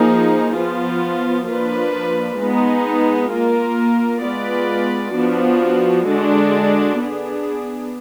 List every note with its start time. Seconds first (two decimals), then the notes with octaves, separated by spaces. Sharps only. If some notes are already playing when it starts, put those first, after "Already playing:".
Already playing: F3 A#3 D#4 G#4
0.55 F3 B3 F4
1.48 F3 A#3 D4 F4 B4
2.39 G#3 B3 D#4
3.31 A#3 F4 A#4
4.23 G#3 B3 F4 B4 D5
5.15 F3 B3 D4 F#4
6.07 D3 G#3 D4 F#4
6.99 B3 D4 G#4